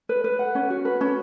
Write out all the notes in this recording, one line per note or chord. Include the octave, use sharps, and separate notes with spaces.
B4
B4
F#5
C#4
F#4
B4
C#4